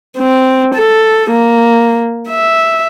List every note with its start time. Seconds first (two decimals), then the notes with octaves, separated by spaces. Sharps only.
0.17 C4
0.75 A4
1.30 A#3
2.29 E5